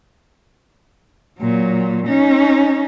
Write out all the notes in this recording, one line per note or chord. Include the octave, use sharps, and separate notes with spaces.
A#2 F#3
C#4 D#4